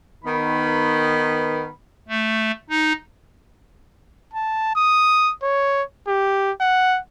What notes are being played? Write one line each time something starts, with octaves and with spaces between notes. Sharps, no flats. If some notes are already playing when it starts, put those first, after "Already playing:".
D#3 B3 B5
A3
D#4
A5
D#6
C#5
G4
F#5